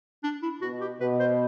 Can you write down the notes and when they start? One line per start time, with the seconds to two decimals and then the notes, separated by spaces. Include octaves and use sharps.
0.24 D4
0.42 E4
0.62 B2 F#4
0.81 G4
1.00 B2 B4
1.20 C5